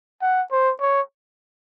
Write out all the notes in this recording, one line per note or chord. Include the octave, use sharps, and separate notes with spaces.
F#5
C5
C#5